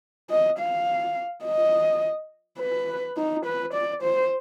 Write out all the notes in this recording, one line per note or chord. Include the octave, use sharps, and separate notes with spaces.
D#5
F5
D#5
B4
D#4
B4
D5
C5